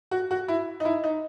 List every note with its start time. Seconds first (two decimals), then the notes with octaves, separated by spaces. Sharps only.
0.11 F#4
0.31 F#4
0.48 E4
0.80 D#4
0.85 E4
1.04 D#4